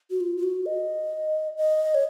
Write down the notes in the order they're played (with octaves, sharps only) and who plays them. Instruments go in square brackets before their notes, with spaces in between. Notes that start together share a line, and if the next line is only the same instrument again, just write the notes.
[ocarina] F#4
F4
F4
F#4
D#5
D#5
C#5